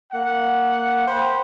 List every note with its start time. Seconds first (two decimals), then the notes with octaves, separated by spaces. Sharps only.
0.11 A#3 F#5
1.05 C5 G5 B5